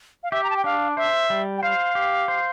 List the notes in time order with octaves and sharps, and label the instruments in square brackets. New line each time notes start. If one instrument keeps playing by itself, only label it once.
[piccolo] F5
[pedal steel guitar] G4 [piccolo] E5
[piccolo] A#5
A5
G5
[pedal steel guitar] D4 [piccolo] F5
[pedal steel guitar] C5 [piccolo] E5
[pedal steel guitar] G3
[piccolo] G5
[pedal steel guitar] C5 [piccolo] F5
[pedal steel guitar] G4
C5